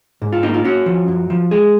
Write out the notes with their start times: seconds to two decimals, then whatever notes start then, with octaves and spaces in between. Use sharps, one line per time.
0.22 G#2
0.33 F4
0.43 A#3 D#4
0.54 F4
0.64 C#4 F#4
0.86 F3
1.08 F#2
1.30 F3
1.51 G#3 G#4